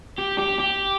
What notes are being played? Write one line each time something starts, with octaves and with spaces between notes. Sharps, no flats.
G4
G4
G4